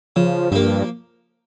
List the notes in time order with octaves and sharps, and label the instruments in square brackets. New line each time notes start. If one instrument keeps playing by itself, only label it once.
[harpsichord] C#3 [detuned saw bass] F3
[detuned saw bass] G2 [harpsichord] F3 A#3